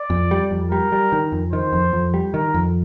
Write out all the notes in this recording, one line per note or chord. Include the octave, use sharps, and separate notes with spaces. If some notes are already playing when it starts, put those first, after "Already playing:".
Already playing: D5
F2
G3
F2
G3 A#4
G3
D#3
F2
D#3 C5
F2
F2
G3
D#3 A#4
F2